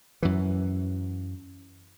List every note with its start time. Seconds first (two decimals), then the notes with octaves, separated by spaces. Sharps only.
0.23 F#2 E3